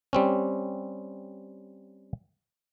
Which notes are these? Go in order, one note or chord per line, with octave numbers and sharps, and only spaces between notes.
G3 C4 C#4